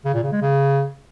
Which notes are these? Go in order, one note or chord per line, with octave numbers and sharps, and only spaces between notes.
C#3
A#2
C#3
G#3
C#3